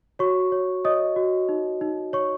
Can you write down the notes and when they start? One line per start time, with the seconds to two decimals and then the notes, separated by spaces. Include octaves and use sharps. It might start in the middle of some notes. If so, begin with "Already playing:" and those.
0.19 F#4 C#5 C#6
0.52 C#5
0.85 C#5 D#5 D#6
1.16 F#4
1.49 D#4
1.81 D#4
2.13 C#5 C#6